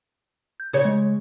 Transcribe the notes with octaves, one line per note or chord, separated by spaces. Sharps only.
G6
C#3 C#5
G#3